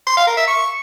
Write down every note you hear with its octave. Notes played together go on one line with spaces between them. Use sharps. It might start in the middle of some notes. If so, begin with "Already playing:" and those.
C6
F5
A#4
E5
C#6